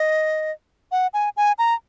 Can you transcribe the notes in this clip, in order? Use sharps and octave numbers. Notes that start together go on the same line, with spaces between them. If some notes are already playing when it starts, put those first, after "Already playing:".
Already playing: D#5
F#5
G#5
G#5
A#5